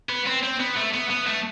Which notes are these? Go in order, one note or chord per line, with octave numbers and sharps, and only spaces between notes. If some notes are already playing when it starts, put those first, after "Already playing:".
B3
C4
C4
B3
A3
B3
B3
A3